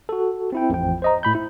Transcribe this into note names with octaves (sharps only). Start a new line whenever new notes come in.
F#4 A4
C4 E4 G5
A1 F2 F3 G5
C5 D#5 A#5
A2 B5 G6
E4